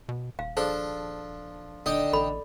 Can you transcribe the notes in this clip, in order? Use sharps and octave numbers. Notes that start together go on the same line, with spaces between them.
B2
D#1 F5
F3 D4 G#4 A4 C5
D#1 D3 D#4 D#5 G5
A1 A4 B5